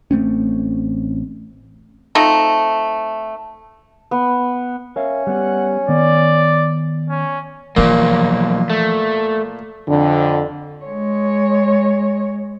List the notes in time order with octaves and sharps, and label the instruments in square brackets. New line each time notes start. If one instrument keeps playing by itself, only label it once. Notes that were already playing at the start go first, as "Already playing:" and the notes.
[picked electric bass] A1 A3 C4 C#4
[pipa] A3 C4 D#4 F4
[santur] B3
[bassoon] C#4 [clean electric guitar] A#4 E5 F5
[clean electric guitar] G3 B3 G4 [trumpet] F#5
[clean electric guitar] D#3 B3 [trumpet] D5
[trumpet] C#4
[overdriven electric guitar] B1 A#3 [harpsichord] A#2 [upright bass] E3 F3
[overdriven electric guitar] A3
[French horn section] F2 D3
[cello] G#3 C#5